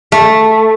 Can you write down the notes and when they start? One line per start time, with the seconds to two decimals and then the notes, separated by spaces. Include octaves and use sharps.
0.12 A3